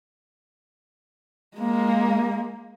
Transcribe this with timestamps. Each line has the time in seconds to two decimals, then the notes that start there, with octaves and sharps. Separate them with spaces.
1.57 G#3 A#3